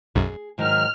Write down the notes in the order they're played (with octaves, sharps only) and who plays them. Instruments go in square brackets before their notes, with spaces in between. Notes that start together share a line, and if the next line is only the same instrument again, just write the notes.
[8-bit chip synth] B1 F#2 [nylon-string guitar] G#4
[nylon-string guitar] G#2 D#3 F#3 [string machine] F6